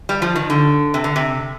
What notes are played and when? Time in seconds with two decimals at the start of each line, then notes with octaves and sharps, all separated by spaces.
0.09 G3
0.22 F3
0.36 D#3
0.50 D3
0.94 C3
1.04 D3
1.16 C3